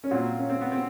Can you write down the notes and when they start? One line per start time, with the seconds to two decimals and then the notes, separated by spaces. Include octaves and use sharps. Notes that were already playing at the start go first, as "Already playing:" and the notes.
0.04 C#4
0.11 A#2 F#3 C4
0.39 C#4
0.50 C4
0.61 B3
0.72 C4